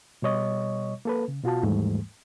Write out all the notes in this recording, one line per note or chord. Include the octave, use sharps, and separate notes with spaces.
B2 G3 C#5 D#5 C#6
A#3 A4 B4
C#3
B2 F4 F#4 F5 A5
D#2 G#2 E3 G3 A3